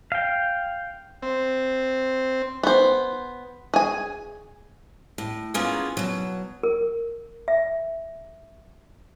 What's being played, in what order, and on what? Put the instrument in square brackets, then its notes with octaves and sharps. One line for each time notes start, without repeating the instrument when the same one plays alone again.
[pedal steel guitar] F5 G5
[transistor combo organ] C4
[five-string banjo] B3 C5
G#4 G#5
[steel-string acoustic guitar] A2
A#3 B3 C#4 F4 G#4
B2 F#3
[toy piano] A#4
E5